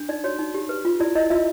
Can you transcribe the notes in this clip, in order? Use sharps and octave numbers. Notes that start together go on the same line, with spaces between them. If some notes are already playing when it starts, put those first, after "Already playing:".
Already playing: D4
D#4 D5
F#4 C#5
D#4
G4
B4
F4
E4 D5
E4 D#5
F4 E5